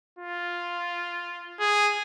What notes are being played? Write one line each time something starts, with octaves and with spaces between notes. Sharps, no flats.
F4
G#4